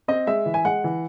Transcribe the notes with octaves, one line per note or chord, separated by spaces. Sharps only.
C4 D#5
G#3 E5
E3
G#5
G#3 F#5
E3